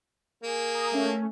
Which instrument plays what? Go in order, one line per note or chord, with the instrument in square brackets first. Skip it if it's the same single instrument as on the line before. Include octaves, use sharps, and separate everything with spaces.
[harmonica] A#3 G#4
[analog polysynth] A#5 D#6
A3 C#4